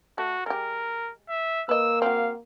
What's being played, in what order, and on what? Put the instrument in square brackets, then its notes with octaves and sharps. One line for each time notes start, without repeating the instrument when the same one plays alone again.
[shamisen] A3 [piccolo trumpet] F#4
[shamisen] G#3 G4 [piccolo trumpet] A#4
[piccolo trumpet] E5
[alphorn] A#3 [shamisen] B4 D#5 [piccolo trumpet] E6
[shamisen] C4 F#4 [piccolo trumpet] F5